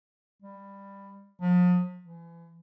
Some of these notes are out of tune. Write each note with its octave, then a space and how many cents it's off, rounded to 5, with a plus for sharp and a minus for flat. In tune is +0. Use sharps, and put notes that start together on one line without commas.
G3 +15
F3 +40
E3 +35